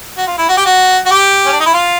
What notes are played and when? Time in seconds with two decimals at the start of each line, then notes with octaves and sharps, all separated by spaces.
0.17 F#4
0.27 F4
0.38 E4
0.49 F#4
0.57 G4
0.66 F#4
1.06 F#4
1.11 G4
1.45 C#4
1.52 D4
1.60 D#4
1.66 E4
1.74 F4